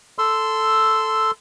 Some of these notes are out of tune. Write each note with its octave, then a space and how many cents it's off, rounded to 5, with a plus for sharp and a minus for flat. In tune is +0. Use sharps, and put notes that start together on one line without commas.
A4 +0 C6 -10 E6 +0